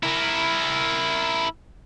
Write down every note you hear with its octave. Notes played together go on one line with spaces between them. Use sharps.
E4 A#4